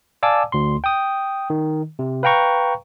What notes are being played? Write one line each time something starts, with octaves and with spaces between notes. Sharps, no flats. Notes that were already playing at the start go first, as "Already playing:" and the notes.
D5 F5 G#5 A5 D6 E6
D2 C6
G5 D#6
D#3
C3
B4 F5 G5 A#5 C#6